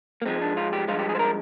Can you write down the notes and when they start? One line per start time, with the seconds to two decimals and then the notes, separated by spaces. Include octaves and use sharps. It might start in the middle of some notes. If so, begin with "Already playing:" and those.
0.22 A#3
0.26 G#2 F3 G#3 C4
0.41 D4
0.57 F4
0.73 G4
0.88 G2 F3 G#3 F4
0.99 G4
1.09 G#4
1.15 C5
1.19 A#4